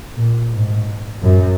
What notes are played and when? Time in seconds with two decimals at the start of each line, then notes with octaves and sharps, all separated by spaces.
0.16 A#2
0.52 G#2
1.22 F#2